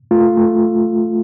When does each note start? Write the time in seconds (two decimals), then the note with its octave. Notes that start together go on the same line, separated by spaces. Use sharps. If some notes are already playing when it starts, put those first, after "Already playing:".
0.11 A3 F4
0.37 A3